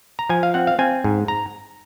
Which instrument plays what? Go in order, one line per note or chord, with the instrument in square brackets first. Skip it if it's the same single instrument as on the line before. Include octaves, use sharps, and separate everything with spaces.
[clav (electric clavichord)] A#5
F3 G#5
F5
C4 F#5
F5
C4 G#5
G#2
A#5